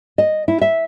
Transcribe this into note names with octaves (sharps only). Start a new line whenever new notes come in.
D#5
E4
E5